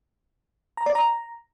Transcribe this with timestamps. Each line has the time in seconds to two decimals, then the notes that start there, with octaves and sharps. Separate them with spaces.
0.77 A#5
0.86 D5
0.95 A#5